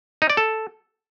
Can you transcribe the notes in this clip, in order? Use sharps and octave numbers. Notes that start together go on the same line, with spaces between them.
D#4
D5
A4